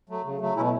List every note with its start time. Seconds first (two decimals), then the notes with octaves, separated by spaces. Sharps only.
0.09 F#3 A3
0.25 C#3
0.41 F#3 A3
0.56 B2 C#4 E4